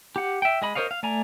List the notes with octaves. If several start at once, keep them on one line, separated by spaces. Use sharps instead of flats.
G4 F#5
E5 G5
G#3 D#5 B5
A#4 C5 C#5 D#5 F5
F5
A3 D5 G#5 A#5